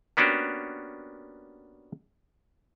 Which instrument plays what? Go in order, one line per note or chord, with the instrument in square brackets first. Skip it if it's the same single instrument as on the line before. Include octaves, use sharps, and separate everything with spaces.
[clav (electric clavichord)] A#3 B3 C#4 D4 F#4 G4